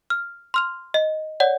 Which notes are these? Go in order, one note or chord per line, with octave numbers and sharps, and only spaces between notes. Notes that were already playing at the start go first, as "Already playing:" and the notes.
F6
C6 F6 F7
D#5
C#5 D5 F#5